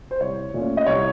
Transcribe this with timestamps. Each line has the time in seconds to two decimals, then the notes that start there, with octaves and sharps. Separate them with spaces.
0.11 C5
0.20 C2 C#5
0.54 A#2 A3 C#4
0.77 D#5
0.86 C2 C#5